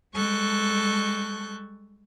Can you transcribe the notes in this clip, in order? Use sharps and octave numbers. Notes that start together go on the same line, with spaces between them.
G3 G#3 A4 C#6 F#6 G6